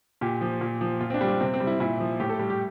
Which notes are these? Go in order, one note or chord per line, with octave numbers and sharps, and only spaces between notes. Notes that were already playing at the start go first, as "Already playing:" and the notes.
A#2 G4
F3
A#2
F3
A#2 F4
C4
D4
G3
C4
C3 C4
C4
G3
E4
A#2 E4
F3
A2 G4
A4
G3
G4